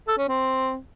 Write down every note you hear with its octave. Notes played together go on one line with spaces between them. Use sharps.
A4
C#4
C4